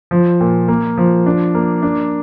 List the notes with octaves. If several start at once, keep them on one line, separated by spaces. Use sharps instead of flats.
F3
A#2
A#3
F3
D4
A#3
D4